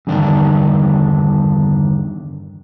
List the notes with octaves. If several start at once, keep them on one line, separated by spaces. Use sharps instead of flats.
E2 G2 D3 D#3 D4